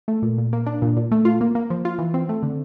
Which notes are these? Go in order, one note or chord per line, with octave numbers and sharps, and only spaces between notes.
A3
A#2
A#2
A#3
D4
A#2
A#2
A3
F4
A#3
A#3
F3
F4
E3
C4
A3
D3